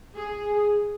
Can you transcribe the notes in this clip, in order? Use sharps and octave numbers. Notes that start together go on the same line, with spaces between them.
G#4